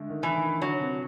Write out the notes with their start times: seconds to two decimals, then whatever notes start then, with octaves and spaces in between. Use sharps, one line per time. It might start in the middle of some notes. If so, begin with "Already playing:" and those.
Already playing: D3 G#3 A3
0.10 D#3
0.23 E3
0.36 D#3
0.61 D3 F#3
0.81 C3